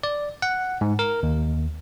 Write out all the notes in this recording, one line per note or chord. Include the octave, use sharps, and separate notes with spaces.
D5
F#5
G#2
A#4
D#2